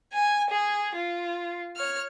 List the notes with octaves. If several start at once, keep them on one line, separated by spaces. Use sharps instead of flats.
G#5
G#4
F4
C#5 F6